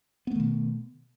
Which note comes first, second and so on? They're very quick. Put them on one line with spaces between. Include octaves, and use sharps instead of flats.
B3 A3 D#3 B2